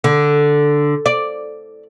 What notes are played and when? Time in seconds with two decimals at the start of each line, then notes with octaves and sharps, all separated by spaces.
0.04 D3
1.06 D5